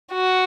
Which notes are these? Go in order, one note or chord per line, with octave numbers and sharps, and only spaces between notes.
F#4